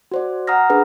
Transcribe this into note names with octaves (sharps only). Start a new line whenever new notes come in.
F#4 C5 D5
F#5 A#5 D#6 F6 A#6
D4 G#4 B4